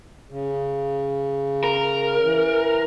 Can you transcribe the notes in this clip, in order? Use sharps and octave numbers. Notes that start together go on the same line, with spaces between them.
C#3
A#4
E3